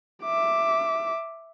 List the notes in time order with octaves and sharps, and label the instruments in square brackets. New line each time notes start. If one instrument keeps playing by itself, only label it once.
[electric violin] E5 D6